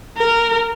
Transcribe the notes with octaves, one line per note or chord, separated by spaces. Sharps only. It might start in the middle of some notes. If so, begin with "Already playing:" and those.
A#4